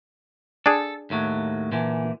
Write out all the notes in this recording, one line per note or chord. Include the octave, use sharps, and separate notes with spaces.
D4 G#4 A4
D#2 A2 F#3
A#2 D3 E3